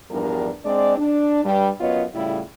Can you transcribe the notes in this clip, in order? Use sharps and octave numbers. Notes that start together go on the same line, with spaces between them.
E2 G2 F3 G3 D4 A#4
G#3 C4 D4 D5
D4
G2 G3
F#2 B3 F4 C#5 D#5
A2 C#3 G3 E4 F4